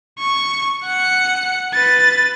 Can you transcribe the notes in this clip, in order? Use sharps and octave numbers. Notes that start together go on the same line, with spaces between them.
C#6
F#5 C#7
B4 A6